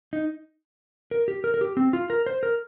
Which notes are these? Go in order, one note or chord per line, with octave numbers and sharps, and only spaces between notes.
D#4
A#4
G4
A#4
A#4
G4
C4
F4
A#4
C5
A#4